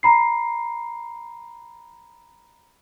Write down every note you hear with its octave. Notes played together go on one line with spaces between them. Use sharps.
A#5 B5 C7